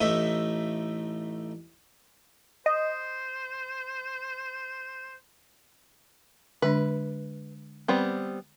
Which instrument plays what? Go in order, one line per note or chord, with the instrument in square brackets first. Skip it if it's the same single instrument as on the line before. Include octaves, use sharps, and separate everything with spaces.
[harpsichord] A1 A3 D#4 E5
[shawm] C5 [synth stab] D#5
[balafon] D3 G#3 D4 [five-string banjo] B4
[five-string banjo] G3 B3 C4